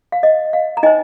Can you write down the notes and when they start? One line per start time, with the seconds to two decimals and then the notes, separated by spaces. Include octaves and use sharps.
0.12 F5
0.23 D#5
0.53 F5
0.77 A#5
0.83 D#4 C5 D#5 G5